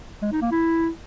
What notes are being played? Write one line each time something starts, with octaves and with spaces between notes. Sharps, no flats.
G#3
D#4
A#3
E4